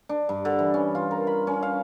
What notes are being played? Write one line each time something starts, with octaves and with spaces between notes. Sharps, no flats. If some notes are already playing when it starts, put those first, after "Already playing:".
D4
G2
D3
E3
C#4
F4
A#4
B5
C#4
F5